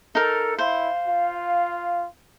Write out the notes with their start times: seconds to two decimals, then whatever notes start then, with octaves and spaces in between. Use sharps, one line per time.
0.15 D#4 A4 A#4
0.59 E4 C5 F5
1.07 F4